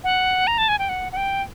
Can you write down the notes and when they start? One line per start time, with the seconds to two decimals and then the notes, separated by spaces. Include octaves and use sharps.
0.04 F#5
0.47 A#5
0.58 A5
0.68 G#5
0.79 G5
0.89 F#5
1.12 F#5
1.17 G5